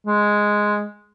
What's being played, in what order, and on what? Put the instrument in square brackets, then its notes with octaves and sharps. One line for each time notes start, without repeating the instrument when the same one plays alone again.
[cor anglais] G#3